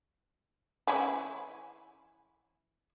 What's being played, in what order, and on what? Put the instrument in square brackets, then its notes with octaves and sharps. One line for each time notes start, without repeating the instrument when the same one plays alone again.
[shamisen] E3 C#4 E4